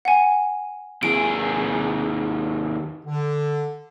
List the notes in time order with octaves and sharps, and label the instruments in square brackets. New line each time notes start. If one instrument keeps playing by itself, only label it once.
[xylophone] F#5 G#5
[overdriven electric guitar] D#2 G#4 [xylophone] D7
[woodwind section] D3